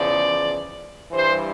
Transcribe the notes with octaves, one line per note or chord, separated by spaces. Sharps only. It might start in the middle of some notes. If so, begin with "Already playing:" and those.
Already playing: E2 C#3 F3 D5
G2 E3 G3 C5